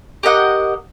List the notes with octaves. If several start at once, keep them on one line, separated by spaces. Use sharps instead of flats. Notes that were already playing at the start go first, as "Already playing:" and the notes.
G4 A#4 D#5 F#5